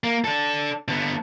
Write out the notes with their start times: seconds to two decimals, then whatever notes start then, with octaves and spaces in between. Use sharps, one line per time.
0.04 A#3
0.25 D4 A4
0.88 D3 B3